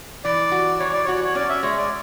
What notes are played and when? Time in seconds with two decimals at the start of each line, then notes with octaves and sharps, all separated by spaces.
0.25 E3 D5
0.52 F#4
0.80 E3 C#5
0.93 D5
1.05 F#4 C#5
1.24 C#5
1.35 C#4 D5
1.49 E5
1.63 G#3 C#5
1.77 D5